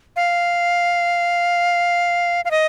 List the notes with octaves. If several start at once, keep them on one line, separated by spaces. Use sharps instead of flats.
F5
F5
D#5